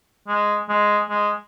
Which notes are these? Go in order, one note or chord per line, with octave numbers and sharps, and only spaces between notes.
G#3
G#3
G#3